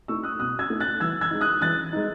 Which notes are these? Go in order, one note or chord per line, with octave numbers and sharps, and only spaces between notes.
A3 D#4 C#6 E6
D#6 F#6
B2 D#6 F#6
E6 G#6
A3 D#4
F#6 A6
E3 E6 G#6
E6 G#6
G#3 D#4
D#6 F#6
E3 F#6 A6
G#3 D#4